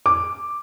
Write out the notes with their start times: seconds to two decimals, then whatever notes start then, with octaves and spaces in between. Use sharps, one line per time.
0.06 D6